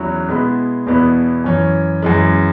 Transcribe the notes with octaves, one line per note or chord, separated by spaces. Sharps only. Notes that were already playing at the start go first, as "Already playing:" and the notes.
Already playing: E2 F#3 C#4 E4
B2 G#3 B3 E4
E2 B2 B3 E4
F#2 E3 C#4
F#2 E3 G#3